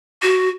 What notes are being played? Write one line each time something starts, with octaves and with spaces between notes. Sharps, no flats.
F#4